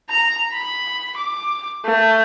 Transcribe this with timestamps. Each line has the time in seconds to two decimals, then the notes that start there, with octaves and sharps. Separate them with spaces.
0.10 A#5
0.52 B5
1.17 D6
1.85 A3